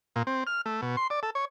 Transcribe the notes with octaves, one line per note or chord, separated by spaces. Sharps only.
A#2
C4
F6
A3
B2
C6
D5
A4
C#5